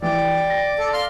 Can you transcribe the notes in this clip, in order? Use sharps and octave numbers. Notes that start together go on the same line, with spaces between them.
E3 D5 G5
A#6
A4
F5 C6 F6